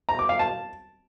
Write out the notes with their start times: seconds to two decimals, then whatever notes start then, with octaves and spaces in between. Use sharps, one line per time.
0.09 A#5
0.19 D6
0.29 F5
0.39 A5